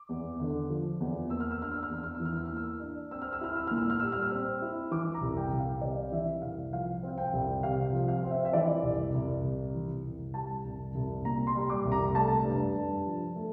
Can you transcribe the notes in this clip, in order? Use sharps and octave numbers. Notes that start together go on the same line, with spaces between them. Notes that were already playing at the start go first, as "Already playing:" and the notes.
Already playing: D6
E2
D3
F3
E2
A#3 E6
F6
E6
D4 F6
E6
F6
E2 E6
F6
E3 E6
F6
E6
A#3 F6
E6
D4
C4 E6
F6
E6
E4 F6
E6
A#2 F6
E6
F6
G3 E6
F6
E6
C4
E4
E3 D6
A#5
C2
G5
C2
F5
C3 D5
E3 E5
C2 F5
F3 F5
C4 F5
G5
C2
C3 F5
F3
F5
C4
E5
E5
E3 D5
C2
C2
C3
E3
C2
G3 A5
C2
C2
A#2 A#5
C6
G3
D6
C2
A#5
A3 A5
G2
G2
F3
A3